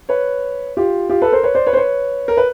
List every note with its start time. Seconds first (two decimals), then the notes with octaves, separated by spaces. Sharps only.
0.09 B4 C#5
0.77 F4 G4
1.09 F4 G4
1.22 A4 B4
1.32 A#4 C5
1.43 B4 C#5
1.55 C5 D5
1.66 B4 C#5
1.73 C5
1.77 B4 C#5
2.28 A#4
2.37 B4